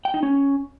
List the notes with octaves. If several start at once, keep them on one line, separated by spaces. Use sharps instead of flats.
G5
D#4
C#4